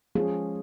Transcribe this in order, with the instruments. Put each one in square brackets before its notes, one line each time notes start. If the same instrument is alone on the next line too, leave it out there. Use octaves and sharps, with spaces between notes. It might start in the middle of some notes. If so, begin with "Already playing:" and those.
[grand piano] F3 G#3 C#4 [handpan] G#4